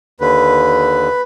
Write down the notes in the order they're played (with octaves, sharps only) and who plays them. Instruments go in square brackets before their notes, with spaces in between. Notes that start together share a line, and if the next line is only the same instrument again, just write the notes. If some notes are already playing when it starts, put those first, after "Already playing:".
[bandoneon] D#2 D3 [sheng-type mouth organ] B4